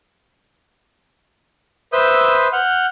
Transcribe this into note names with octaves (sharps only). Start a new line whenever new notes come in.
B4 C5 E5 D#6 E6 G6
F#5 F6 G6